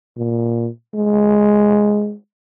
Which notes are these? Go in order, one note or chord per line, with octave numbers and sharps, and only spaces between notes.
A#2
G#3